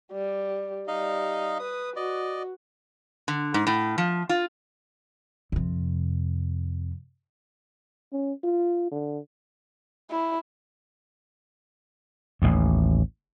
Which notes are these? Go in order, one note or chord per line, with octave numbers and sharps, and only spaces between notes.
G3
G3 D#4 D#5 F5
B4 D#6
F#4 D5 D#5
D3
G#2
A2
F3
F4
F2 C3
C#4
F4
D3
E4
A1 D#2